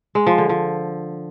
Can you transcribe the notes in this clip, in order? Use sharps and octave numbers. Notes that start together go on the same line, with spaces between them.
G#3
F3
D3
F3